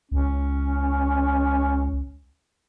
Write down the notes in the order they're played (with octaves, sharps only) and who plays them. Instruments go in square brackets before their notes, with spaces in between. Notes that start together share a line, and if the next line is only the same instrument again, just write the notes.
[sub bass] C#2 [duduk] C#4